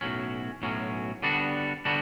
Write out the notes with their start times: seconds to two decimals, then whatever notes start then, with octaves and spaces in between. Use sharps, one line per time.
0.01 B1 A2 F#3 C#4
0.62 B1 A2 F#3 C#4
1.23 D3 G3 B3 D4 F#4
1.85 D3 G3 B3 D4 F#4